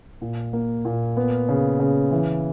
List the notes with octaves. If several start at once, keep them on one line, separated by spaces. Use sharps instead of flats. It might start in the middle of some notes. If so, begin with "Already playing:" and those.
A#2
A#3
A#2
B3
C#3
C#3
E3